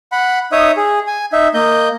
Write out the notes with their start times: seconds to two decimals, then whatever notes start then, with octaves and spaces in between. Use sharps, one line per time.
0.12 F#5 B5
0.52 D#4 C#5 E5 D#6
0.77 G#4
1.07 G#5
1.33 D#4 E5
1.54 A#3 D#5 G6